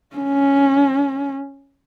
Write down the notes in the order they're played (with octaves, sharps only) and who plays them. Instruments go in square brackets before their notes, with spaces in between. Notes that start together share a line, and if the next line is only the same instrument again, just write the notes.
[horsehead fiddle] C#4